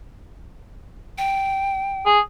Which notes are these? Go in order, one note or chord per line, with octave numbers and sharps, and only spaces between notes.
G5
G#4